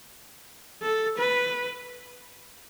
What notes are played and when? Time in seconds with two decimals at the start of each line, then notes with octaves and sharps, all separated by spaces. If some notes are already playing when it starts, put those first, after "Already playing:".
0.82 A4
1.18 B4